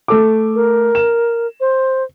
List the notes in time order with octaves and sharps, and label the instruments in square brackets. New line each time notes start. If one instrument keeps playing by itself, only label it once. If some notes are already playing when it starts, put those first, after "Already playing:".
[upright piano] A3 A4 D6
[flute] A#4
[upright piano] E7
[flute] C5